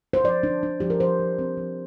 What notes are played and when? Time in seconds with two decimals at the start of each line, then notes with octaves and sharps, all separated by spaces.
0.13 C5
0.24 F3 D5
0.43 D4
0.63 D4
0.80 F3 G4
0.90 A#4
1.00 F3 C5
1.19 F3
1.39 C4
1.57 F3